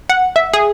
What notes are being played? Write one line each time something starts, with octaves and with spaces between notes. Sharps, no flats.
F#5
E5
G#4